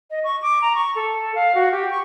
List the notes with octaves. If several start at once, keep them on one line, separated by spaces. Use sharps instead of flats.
D#5
C#6
D6
A#5
C#6
A4
F5
F#4
G4
C#6